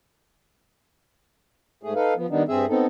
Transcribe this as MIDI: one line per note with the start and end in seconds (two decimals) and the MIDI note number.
1.83 1.93 44
1.83 1.93 57
1.83 1.93 68
1.95 2.14 63
1.95 2.14 69
1.95 2.14 71
1.95 2.14 77
2.17 2.27 53
2.17 2.27 59
2.30 2.43 51
2.30 2.43 55
2.30 2.43 59
2.30 2.43 62
2.30 2.43 63
2.48 2.65 43
2.48 2.65 60
2.48 2.65 68
2.48 2.65 76
2.69 2.86 59
2.69 2.86 60
2.69 2.86 63
2.69 2.86 69